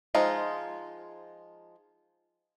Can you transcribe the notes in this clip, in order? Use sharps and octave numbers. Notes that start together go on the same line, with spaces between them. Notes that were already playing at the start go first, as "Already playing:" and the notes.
F3 G#3 D#4 F4